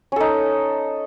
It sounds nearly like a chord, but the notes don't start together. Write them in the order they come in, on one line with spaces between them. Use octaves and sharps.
C#4 A4 D#4